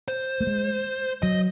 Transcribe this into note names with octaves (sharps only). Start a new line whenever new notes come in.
C5
A3
G#3
F#3 D#5